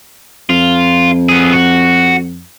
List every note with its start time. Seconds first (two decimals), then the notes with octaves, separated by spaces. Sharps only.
0.50 F2 F4
1.29 B3 G#4
1.53 F#4